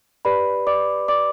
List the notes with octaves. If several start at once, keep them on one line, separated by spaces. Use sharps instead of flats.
G4 B4 D5 B5
D5 D6
D5 D6